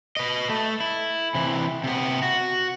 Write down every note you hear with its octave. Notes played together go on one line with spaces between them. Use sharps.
B4 D#5
A3
E4
C3 E3
C3 B3
F#4